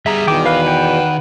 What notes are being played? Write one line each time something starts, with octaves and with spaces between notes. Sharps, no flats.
G3 B3 G#4 E5 A#5
E2 B2 D#3 E3 G5 D6
A#4 B4 F5
F#5 G5